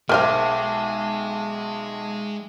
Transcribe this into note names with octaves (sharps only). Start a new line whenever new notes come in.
B1 G#3 A#4 C5 E5 F5 G5 D6